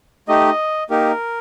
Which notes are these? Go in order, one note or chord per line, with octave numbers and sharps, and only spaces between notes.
A3 D#4 G4 D#5
A#3 D#4 G4 A#4